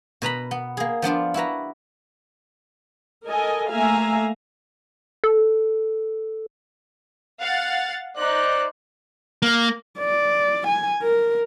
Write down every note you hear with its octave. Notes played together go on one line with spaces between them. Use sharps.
B2 B4 A#5 B5
B3
A#3 G#4
F3 B3 D4 F4
E4 F#4 B4 A#5
A4 A#4 D#5 G#5
A3 A#3 E5 F5 G#5 A#5
A4
F5 F#5 A6
D#4 C5 D5 F#6
A#3
D5
G#5
A#4